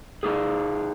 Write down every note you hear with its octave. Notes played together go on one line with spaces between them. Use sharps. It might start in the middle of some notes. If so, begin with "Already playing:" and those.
A#3 D#4 G#4